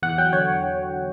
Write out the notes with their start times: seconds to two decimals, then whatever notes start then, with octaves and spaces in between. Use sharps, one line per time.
0.03 E2 F#5
0.18 F#3 G5
0.33 D3 C#5